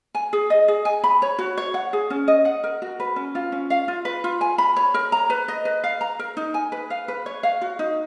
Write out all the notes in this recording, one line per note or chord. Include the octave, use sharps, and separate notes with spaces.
G#5
G#4
D#5
G#4
G#5
B5
C#5
F#4
C#5
F#5
G#4
C#4
D#5
F#5
A#4
F#4
B4
C#4
F4
C#4
F5
F4
B4
F4
G#5
B5
C#5
A#4
A#5
B4
D#5
B4
F5
A#5
A#4
D#4
G#5
B4
F5
B4
C#5
F5
F#4
D#4